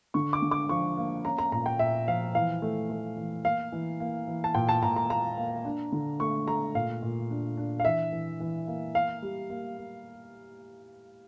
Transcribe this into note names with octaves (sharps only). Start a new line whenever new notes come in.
D3 C#6
D6
D3
D6
F3 C#6
A#3
C#4 A#5
A#5
A#2 A#5
G5
A#2 E5
F3 F5
E3 F5
A3
A3
E3
A#3 F5
E3
A#3
E3
A5
A#2 G5
A5
A#2 A#5
A#5
A#3 A#5
A#3
D4
D3
A3 C#6
A3 A#5
A#2 F5
A#2
D4
D4
F5
E3 E5
E3
E3
A#3
A#3 F5
G3
A#3
A#3